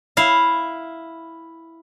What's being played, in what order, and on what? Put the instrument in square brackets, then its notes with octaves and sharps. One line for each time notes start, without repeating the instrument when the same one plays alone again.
[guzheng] E4 F5